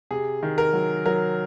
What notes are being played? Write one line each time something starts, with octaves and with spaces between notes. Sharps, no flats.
C3 G#4
D#3
A#4
F#3
F#3 A#4